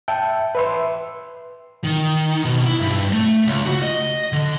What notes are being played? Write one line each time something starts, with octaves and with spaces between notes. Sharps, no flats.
E5 G5 A5
B4 E5 C6
D#3
B2
E4
G2
A3
C#2
F#4
D#5
D3